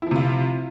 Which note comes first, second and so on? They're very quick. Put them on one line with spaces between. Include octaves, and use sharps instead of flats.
E4 F3 C3 F4